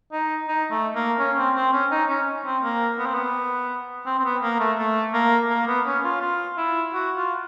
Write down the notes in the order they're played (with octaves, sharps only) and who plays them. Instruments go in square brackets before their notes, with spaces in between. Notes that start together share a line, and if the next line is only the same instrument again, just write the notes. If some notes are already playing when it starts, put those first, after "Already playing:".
[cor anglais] D#4
D#4
A3
A#3
C#4
C4
C4
C#4
D#4
C#4
C4
A#3
B3
C4
B3
C4
C4
B3
A#3
A3
A3
A#3
A#3
B3
C#4
F4
F4
E4
F#4
F4